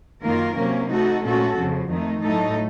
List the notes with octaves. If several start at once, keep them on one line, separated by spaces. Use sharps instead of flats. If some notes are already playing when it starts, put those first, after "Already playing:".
F#2 D#3 A#3 F4 A#4
C3 F#3 A#3 C#4
A3 D#4 F#4 A4
A#2 A3 C#4 F#4 A4
F2 C#3 F3
F2 D#3 A3 D#4
A2 F#3 A3 D#4 A4